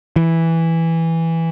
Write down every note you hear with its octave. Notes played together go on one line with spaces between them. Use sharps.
E3